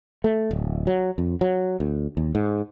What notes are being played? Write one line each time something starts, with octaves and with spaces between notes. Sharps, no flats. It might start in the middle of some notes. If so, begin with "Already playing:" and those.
A3
D1
F#3
F2
F#3
D2
D#2
G#2